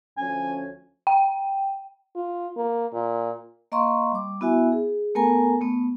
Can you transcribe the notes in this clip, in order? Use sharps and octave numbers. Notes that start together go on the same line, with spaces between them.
D2 F3 C#4 G#5
G5
F4
A#3
A#2
A#3 D#5 F5 A#5 C6 C#6
G3 D6
B3 E4 F#4 E5 G#5
G#4
A3 B3 A4 A#4 G#5 A#5
A3 B3